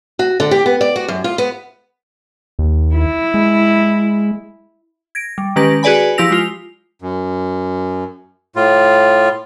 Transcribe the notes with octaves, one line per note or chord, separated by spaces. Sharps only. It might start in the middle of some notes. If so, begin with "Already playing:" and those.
F#4
D3
G4
B3
D5
F#4
F#2
F4
B3
D#2
E4
G#3
G#6 A#6 D7
G3
D#3 G#3 C#4 G4 B4 A#6
F#4 G#4 B4 D5 G#5 B5
F3 E4 G4 E6 A#6 F7
G#3 F4 F7
F#2
A2 F4